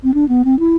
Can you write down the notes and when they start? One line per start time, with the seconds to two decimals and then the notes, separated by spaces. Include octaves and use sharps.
0.04 C4
0.14 D4
0.29 B3
0.45 C4
0.59 E4